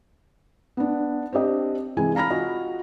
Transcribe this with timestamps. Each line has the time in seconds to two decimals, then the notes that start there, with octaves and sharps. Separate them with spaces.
0.77 B3 D4
1.33 C4 D4 G4 D#5
1.97 C3 E3 G#3 G#5
2.15 F5 A#5 B5 F6 A#6
2.30 F4 F#4 D#5